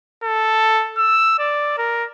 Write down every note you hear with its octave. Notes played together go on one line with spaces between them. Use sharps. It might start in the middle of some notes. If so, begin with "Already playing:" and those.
A4
E6
D5
A#4